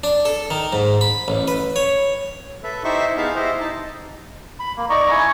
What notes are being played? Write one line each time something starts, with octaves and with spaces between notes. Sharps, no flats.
D4
A4
D#3
G#2
B5
A1
B4
C#5
A4 B4 E5
D#4 E4 G4 C5 E5 C#6
B3 D#4 G#4 E5 F5 A5
E4 G4 C5 D#5
D#4 A5
B5
A#3
D#4 D5 A#5 C#6
E4 G#5 C#6